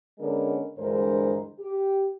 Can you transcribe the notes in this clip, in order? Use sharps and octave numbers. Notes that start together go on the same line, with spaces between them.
D3 G#3 B3 C#4 A#4
D2 G2 E3 G#3 A#4 C5
G4